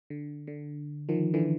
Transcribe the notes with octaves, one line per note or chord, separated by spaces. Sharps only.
D3
D3
D#3 F3
D3 E3